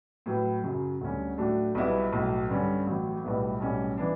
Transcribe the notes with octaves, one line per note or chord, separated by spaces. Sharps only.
A2 F#3 B3
F#2 C#3 F#3
D2 D3 G3 C#4
A2 F#3 A3 D4 F#4
B1 B2 G3 B3 E4
B1 A2 F#3
G2 D3 G3 C#4
A1 A2 F#3
B1 A2 G3 B3 E4
B1 A2 G3 C#4
E3 B3 D4